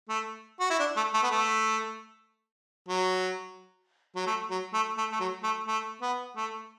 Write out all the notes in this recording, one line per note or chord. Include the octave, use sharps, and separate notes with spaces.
A3
F#4
E4
D4
A3
A3
B3
A3
F#3
F#3
A3
F#3
A3
A3
A3
F#3
A3
A3
B3
A3